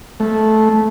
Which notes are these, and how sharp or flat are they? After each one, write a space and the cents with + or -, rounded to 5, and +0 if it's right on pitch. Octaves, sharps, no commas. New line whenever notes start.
A3 -10